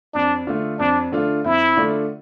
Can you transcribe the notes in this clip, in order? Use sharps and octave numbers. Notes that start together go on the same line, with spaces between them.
F2 D4
D3 A3 D4 F4
F2 D4
D3 A3 D4 F4
F2 E4
D3 A3 D4 F4